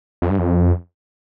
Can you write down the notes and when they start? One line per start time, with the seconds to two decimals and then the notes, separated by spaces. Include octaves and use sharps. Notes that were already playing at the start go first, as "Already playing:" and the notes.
0.22 F2
0.30 G2
0.38 F2